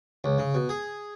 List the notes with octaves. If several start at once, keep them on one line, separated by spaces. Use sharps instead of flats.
C#2
C#3
B2
G#4